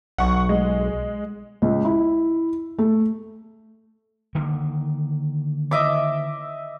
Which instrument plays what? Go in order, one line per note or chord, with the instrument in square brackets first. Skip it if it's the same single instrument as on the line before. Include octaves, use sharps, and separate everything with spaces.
[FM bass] B1 [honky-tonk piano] F#5 C#6
[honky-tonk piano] G#3
[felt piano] C#2
E4
A3
[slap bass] D3 D#3 A#3
[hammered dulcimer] D#5 E5 D6